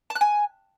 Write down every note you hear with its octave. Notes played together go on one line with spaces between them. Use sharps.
A5
F#6
G#5